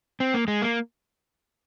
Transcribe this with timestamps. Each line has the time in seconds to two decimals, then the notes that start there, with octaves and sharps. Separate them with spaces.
0.20 C4
0.34 A#3
0.48 G#3
0.62 A#3